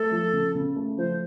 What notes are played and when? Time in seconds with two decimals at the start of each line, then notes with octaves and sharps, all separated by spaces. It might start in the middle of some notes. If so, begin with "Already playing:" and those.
Already playing: A3 A4
0.11 F3
0.33 C#3
0.55 C#3
0.76 A3
0.98 F3 C5